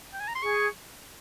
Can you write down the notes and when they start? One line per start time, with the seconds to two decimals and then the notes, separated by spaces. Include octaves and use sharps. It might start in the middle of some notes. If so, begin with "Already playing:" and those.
0.13 G5
0.20 G#5
0.28 A#5
0.35 C6
0.42 G#4 C#6